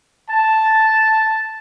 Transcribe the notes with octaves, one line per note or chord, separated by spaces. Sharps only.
A5